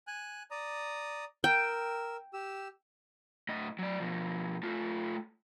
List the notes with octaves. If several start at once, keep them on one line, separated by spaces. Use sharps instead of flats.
G#5 F#6
D5 A#5 D#6
A#4 G5 E6
G4 E6
A2 D#5
F#3 D5
B2 F3
A3 F4